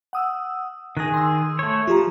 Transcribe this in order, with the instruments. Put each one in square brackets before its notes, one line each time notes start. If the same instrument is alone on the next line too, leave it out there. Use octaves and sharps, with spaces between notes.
[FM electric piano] F#5 D#6 E6
[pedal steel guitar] D#3 G#4 [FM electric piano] F#6 A#6
[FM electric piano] C6 E6
[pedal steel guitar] A3 C#5
[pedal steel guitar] F3 [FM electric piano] F4 G4 A#5